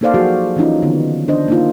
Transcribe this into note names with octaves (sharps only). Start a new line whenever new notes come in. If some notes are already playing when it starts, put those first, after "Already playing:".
A#3 D#4 A4 C5 D5 F5
F3 F#3 F#4 G#4
E3 F3 C#4 D#4 F4
D3 D#3 B3
D4 C5 D#5
A#3 D#4 F4